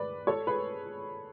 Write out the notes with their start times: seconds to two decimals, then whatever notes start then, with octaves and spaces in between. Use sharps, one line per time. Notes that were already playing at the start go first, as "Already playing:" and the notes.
Already playing: B4 D5
0.27 A4 C#5
0.47 G#4 B4